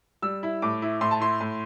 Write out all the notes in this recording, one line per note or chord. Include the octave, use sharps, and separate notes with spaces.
G3 E6
E4
A2 D6
E4
A2 C6
A5
E4 C6
A2